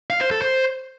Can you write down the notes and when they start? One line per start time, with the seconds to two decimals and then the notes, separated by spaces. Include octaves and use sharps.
0.10 F5
0.21 C5
0.31 A4
0.42 C5